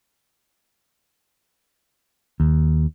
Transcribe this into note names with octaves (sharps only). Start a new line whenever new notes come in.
D#2